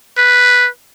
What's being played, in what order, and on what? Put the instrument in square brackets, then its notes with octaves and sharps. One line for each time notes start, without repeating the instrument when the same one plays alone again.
[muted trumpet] B4